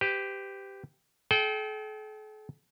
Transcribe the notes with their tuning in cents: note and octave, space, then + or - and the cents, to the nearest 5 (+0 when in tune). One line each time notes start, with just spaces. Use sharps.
G4 +0 B4 +45
A4 -45 G5 -15